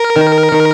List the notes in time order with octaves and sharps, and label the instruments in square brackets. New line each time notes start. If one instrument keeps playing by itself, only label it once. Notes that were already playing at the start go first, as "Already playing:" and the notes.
Already playing: [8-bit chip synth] A#4
[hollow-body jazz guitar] D#3
D#3